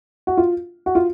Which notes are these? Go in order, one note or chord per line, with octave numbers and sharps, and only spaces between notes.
F#4
F4
F#4
F4